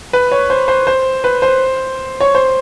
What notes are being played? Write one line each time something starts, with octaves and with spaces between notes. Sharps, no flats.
B4
C#5
C5
C5
C5
B4
C5
C#5
C5